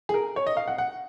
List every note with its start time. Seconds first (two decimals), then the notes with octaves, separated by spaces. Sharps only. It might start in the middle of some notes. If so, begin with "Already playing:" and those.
0.09 G#4
0.14 A#4
0.36 C#5
0.47 D#5
0.57 F5
0.68 F#5
0.78 F#5